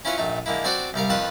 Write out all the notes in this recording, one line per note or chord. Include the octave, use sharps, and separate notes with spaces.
C#4 E4 F4 B4 C#5
A#1 A3 D#4
D3 G#3 A#3 E4
C4 D4 F#4 C5 D5
C2 G3 A#4 F5
F2 D#3 F4 B4 A5 B5